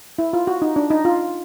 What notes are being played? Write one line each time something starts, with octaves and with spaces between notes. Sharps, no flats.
E4
F4
F#4
D#4
D4
D#4
F4